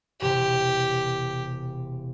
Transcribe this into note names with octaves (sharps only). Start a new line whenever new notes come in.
E1 C3 G4